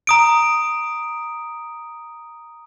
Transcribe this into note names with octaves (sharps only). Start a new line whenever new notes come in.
A#5 D#6 D7